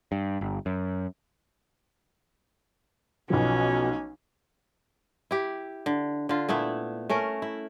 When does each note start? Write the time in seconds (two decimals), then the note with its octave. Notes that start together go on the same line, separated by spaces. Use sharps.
0.12 G2
0.41 G1
0.66 F#2
3.30 B1 B2 F3 C#4
5.31 E4 G4
5.86 D3
6.29 D3 F4
6.49 A#2 A3 B3 E4
7.09 A3 C#4 A#4
7.42 E4